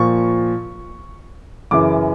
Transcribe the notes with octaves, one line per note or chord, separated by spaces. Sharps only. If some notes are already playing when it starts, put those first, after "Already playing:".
Already playing: A#2 F3 C#6
F#2 C#3 E3 D6